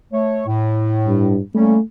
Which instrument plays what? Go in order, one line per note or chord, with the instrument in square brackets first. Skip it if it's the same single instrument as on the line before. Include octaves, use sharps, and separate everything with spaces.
[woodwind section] A3 C#5
A2
[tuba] G2
[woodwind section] G3 A#3 C#4 [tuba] A3